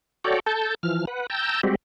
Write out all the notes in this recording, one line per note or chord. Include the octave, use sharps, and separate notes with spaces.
F#4 A4 C#5 D5 G5
A4 A5 G6
E3 F3 F6
B4 F#5
G5 A5 A#5 E6 G6
G3 G#3 C4 F#4 G4